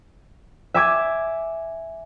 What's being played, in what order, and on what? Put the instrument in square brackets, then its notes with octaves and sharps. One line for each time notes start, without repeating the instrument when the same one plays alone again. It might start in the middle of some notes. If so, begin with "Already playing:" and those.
[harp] E5 G#5 D6 G#6